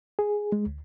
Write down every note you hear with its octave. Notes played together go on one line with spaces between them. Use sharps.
G#4
G#3
D2